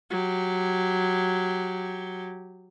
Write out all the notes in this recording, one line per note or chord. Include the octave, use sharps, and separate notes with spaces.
F#3 G4